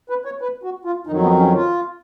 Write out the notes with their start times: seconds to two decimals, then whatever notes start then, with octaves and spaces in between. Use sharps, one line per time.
0.09 B4
0.25 C#5
0.41 B4
0.63 F#4
0.85 F4
1.07 F2 D#3 F#3 D#4
1.23 B3
1.39 C#4
1.56 F4